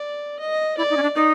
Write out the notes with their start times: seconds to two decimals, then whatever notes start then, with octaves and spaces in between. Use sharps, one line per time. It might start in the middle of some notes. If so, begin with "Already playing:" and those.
Already playing: D5
0.39 D#5
0.77 E4 D5
0.90 D#4
0.97 C#4
1.02 D4
1.15 D#4